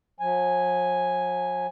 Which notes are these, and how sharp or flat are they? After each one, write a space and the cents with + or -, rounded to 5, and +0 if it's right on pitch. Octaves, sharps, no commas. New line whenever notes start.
F3 +45 G#5 +0